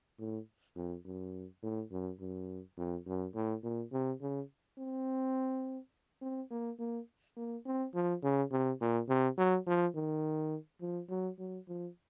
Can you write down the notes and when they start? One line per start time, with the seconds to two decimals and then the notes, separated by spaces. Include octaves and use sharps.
0.19 A2
0.76 F2
1.05 F#2
1.63 A2
1.91 F#2
2.20 F#2
2.77 F2
3.06 F#2
3.34 A2
3.63 A#2
3.92 C3
4.21 C#3
4.78 C4
6.22 C4
6.50 A#3
6.79 A#3
7.36 A#3
7.66 C4
7.94 F3
8.23 C#3
8.51 C3
8.81 A#2
9.09 C3
9.38 F#3
9.66 F3
9.95 D#3
10.81 F3
11.09 F#3
11.38 F#3
11.68 F3